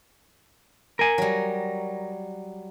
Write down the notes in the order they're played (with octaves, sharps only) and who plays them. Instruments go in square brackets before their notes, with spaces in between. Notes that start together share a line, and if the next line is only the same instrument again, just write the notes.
[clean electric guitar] A#4 G#5
[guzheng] F#3 G3